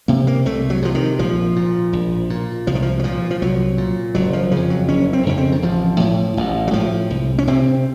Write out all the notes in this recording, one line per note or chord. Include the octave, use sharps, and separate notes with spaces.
C3 A#3
A#3
C2 A3
F#3
C3 F3
D#3
A#1 F3
A#2
A#1
A#2
C2 F3
D#3
F3
F#3
A#2 F3
F3
C2 F#3
A#2
F#1 F#3
F3
F2 C#3 F3
F#3
F#1 C#4
C4
F2 C#3 C#4
C4
D#3
A1 F3
A2
A1
F#3
A2 F3
C2
C#4
C3 C4